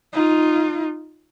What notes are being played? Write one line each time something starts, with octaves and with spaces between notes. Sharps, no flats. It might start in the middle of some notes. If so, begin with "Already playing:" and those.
D#4 F4